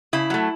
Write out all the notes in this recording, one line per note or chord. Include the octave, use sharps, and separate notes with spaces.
C#3 E4
F#3 A3